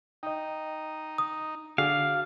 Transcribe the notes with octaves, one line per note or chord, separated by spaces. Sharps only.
D#4 D#5 G5
D#6
D3 D4 F#4 G#4 F5